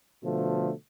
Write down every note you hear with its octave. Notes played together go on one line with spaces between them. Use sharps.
B2 D3 F3 A3